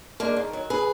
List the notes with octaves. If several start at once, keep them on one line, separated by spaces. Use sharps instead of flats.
G#2 A#3 D4
D#3
F#3
G#4 B4